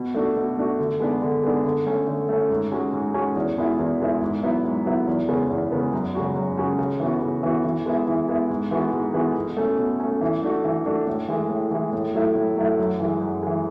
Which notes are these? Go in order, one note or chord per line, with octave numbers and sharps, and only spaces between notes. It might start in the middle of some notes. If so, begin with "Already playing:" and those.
Already playing: B2
A3 D4 F#4
B2
A3 D4 F#4
D3
G#3 B3 D4
D3
G#3 B3 D4
D3
A3 C#4
D3
A3 C#4
G#2
G#3 C#4 F#4
G#2
G#3 C#4 F#4
E2
B2 G#3 B3 E4
E2
B2 G#3 B3 E4
G#2
F#3 B3 E4
G#2
F#3 B3 E4
E2
C#3 G#3 B3
E2
C#3 G#3 B3
F#2
C#3 G#3 C#4 F#4
F#2
C#3 G#3 C#4 F#4
C#3
E3 B3 F#4
C#3
E3 B3 F#4
E3
G#3 B3 E4
E3
G#3 B3 E4
G#2
E3 G#3 B3 F#4
G#2
E3 G#3 B3 F#4
B2
A3 C#4
B2
A3 C#4
E3
A3 D4 F#4
E3
A3 D4 F#4
A2
E3 G#3
A2
E3 G#3
A2
F#3 A3 E4
A2
F#3 A3 E4
F#2
E3 G#3
F#2
E3 G#3